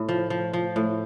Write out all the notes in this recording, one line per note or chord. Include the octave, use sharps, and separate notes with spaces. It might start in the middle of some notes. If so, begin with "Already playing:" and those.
Already playing: A2
F3
F3
F3
A2